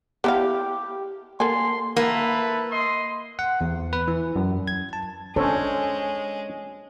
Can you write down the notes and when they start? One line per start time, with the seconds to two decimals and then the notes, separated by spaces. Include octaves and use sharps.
0.24 B3 E4 G4 F5
1.40 A#3 A4 G#5 C6
1.97 A#3 E4 A4 B4
2.71 D#5 C6
3.39 F#5
3.61 E2
3.93 B4
4.08 E3
4.36 F#2
4.68 G#6
4.93 A5
5.36 G#3 C#4 D4 A4 C5 C#5